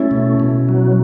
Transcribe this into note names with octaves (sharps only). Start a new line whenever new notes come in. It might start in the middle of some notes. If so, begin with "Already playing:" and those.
Already playing: A3 C#4 E4
B2
B2
F#3